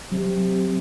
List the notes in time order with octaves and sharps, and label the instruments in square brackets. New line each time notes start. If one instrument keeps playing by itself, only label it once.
[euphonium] C3 [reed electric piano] F#3